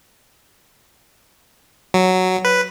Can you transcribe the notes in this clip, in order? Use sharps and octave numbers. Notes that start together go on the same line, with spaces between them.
F#3
B4